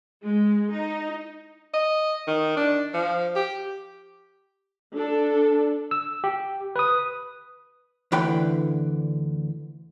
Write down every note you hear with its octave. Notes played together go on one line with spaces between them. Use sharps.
G#3
D#4
D#5
D#3
D4
F3
G4
D4 A4
E6
G4
B4 D#6
D2 D3 E3 G5 B5